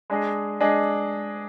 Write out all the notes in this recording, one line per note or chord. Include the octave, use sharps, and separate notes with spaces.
G#3 D4 G#4 D#5
G#3 D4 G#4 D#5